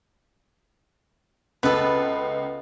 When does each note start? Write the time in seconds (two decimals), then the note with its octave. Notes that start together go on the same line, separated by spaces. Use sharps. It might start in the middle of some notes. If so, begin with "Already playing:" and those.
1.63 C#2 B3 F4 A4 B4